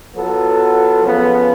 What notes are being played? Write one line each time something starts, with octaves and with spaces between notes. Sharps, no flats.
F#3 B3 F4 A4
C#3 F3 B3